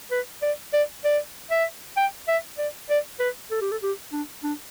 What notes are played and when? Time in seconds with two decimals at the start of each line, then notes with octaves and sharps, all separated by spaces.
0.11 B4
0.42 D5
0.73 D5
1.04 D5
1.51 E5
1.97 G5
2.28 E5
2.58 D5
2.90 D5
3.20 B4
3.51 A4
3.61 G4
3.71 A4
3.82 G4
4.12 D4
4.43 D4